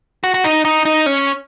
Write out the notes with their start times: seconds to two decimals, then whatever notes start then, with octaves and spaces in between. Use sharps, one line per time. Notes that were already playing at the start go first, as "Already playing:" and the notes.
0.24 F#4
0.34 F#4
0.44 D#4
0.65 D#4
0.85 D#4
1.06 C#4